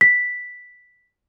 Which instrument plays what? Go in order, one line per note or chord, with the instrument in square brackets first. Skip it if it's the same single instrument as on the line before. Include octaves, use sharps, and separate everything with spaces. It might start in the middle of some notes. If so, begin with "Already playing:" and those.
[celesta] B6